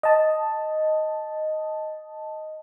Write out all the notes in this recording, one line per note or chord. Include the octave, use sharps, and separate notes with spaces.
D#5 A5